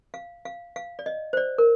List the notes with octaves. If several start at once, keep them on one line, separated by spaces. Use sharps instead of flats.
F5
F5
F5
D5
D#5
C5
D5
A#4